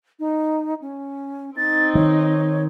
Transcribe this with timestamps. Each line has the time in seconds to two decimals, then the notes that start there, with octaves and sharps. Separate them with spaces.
0.20 D#4
0.82 C#4
1.56 C4 D#4 A6
1.95 D#3 C#5